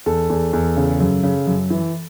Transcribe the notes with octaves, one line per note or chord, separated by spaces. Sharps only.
E2 A4
E2
E2
C#3
F#2
C#3
F#2
E3